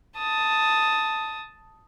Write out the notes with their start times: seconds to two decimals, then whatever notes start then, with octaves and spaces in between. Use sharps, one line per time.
0.18 A5 D#6